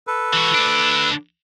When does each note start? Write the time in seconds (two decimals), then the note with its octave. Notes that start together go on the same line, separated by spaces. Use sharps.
0.07 A4 B4
0.33 E3 F#4
0.54 D2 D4